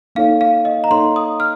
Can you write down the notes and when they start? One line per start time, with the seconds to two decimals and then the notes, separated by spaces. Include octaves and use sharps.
0.15 A#3 D#4 A4 C#5 F5
0.41 F5
0.65 D#5
0.84 A#5
0.90 A#3 D#4 A4 C#5 C6
1.16 D#6
1.40 F6